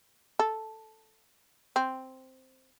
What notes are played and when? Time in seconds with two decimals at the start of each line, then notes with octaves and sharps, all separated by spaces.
0.39 A4
1.76 C4